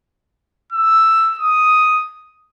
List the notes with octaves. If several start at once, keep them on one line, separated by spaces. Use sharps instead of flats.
E6
D#6